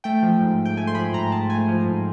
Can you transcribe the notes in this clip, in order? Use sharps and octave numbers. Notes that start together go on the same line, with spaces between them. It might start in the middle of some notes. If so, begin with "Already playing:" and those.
A3 G5
F3
G#2
G#2
G5
A3 G#5
C6
F3 B5
G#2 A#5
G#2 A5
A3 G#5
F3
G#2